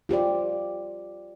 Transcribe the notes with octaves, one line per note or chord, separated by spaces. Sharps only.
F4 G4 C5 D5